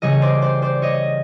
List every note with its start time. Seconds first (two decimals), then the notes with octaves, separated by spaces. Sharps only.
0.02 C#3 E3 G3 C#5 D#5
0.22 C5 D5
0.42 C5 D5
0.62 C5 D5
0.82 C#5 D#5